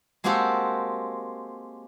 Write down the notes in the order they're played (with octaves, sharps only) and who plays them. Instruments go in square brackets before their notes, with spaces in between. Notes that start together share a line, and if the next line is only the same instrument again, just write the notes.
[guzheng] G#3 A#3 C4 F#4 G4 A4